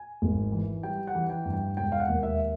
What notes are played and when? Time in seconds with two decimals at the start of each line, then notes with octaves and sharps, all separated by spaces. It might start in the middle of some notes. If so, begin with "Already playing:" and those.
Already playing: G#5
0.22 G#1
0.52 E3
0.83 G3 G5
1.07 F#5
1.15 E3
1.30 G5
1.45 G2
1.54 G5
1.77 E1 G5
1.92 F5
2.00 F#5
2.08 D#2
2.23 E5